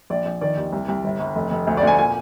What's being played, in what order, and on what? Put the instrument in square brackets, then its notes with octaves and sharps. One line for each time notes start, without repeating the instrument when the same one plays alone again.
[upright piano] A#1 D5
A#1
D#3 D5
D#2
C2
C2
G1
G1
F1
F1
D2
D5
D2 G#5
A#2 G#5